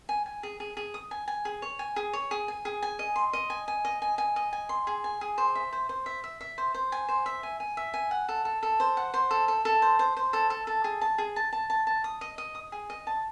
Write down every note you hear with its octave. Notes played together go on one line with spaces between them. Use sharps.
G#5
G#5
G#4
G#4
G#4
D#6
G#5
G#5
G#4
C#5
G#5
G#4
C#5
G#4
G#5
G#4
G#5
D#5
C6
D#5
G#5
G#5
D#5
G#5
G#5
D#5
G#5
C6
G#4
G#5
G#4
C5
E5
C5
C5
E5
E5
E5
C5
C5
G#5
C5
E5
G#5
G#5
E5
G#5
F#5
A4
A4
A4
C5
F#5
C5
A4
A4
A4
C5
C5
C5
A4
A4
A4
G#4
A5
G#4
A5
A5
A5
A5
D#6
D#5
D#5
D#6
G#4
D#5
A5